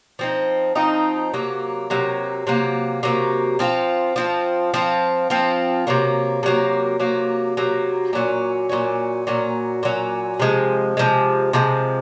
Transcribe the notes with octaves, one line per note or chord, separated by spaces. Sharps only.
F3 C4 D#4
F3 C4 D#4
C3 F#3 A#3
C3 F#3 A#3
C3 F#3 A#3
C3 F#3 A#3
F3 C4 F4
F3 C4 F4
F3 C4 F4
F3 C4 F4
C3 F#3 A#3
C3 F#3 A#3
C3 F#3 A#3
C3 F#3 A#3
A#2 F#3 C#4
A#2 F#3 C#4
A#2 F#3 C#4
A#2 F#3 C#4
C3 F3 G#3
C3 F3 G#3
C3 F3 G#3